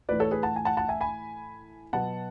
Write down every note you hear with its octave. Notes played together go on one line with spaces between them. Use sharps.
A2 E3 A3 B4 D5
A4 C#5
G#4 B4
F#5 A5
G#5
F#5 A5
F#5 A5
E5 G#5
G#5 B5
B2 F#3 B3 F#5 A5